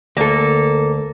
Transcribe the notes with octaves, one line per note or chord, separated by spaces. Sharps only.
D2 A#3 A4